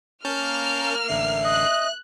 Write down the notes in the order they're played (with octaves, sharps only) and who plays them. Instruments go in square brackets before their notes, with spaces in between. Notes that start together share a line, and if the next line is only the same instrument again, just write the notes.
[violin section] A#3 F6 [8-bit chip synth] C#4 A5 G6
[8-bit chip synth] A1 D3 C7 [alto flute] E5
[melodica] D#5 [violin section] F#6